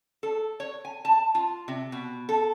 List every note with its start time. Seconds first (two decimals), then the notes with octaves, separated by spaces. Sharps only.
0.23 A4
0.60 C#5
0.85 G#5
1.05 A5
1.35 F4
1.68 C3
1.92 B2
2.29 A4